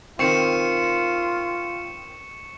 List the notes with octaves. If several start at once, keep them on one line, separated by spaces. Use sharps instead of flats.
D#3 C4 F4 C#6 C#7 E7